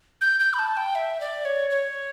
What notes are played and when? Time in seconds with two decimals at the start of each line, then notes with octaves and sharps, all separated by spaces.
0.21 G6
0.40 G6
0.54 B5
0.59 A5
0.77 G5
0.95 E5
1.21 D5
1.45 C#5
1.70 C#5